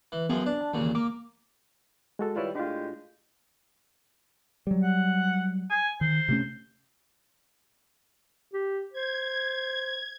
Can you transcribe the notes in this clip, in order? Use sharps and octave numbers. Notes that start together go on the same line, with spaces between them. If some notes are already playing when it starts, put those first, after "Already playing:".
E3
F#2 F3 B3 G#4
D4
A5
D#2 A#2 C#3 E3
A#3 D6
G#3 F#4 A4
D#3 G3 E4 F4 B4 C#5
A2 G#3 D4 F4 G4
F#3 G3
F#5
G#5
D#3 C5
C3 A3 C#4
G4
C5 G#6